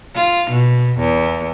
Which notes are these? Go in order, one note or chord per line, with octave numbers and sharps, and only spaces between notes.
F4
B2
E2